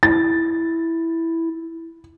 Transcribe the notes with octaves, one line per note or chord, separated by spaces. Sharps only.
E4 A6